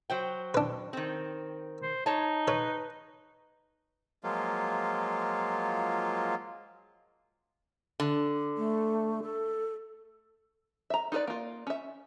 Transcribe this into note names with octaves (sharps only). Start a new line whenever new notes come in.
F#3 C5 G5
D4 B4
D#3 C4
C5
D#4 C#5 A5
B4 C#5
F3 F#3 G#3 A#3 F4
D3
A3
A4
E5 A#5
D#4 F4 G#4 B4 D5
A#3 F4
C#4 E5